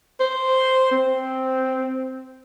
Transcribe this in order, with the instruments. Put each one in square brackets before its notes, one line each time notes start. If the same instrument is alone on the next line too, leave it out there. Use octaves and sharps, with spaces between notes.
[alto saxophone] C5
C4